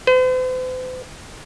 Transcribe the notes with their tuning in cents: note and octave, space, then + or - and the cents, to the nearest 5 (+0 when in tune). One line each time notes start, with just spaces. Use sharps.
C5 -45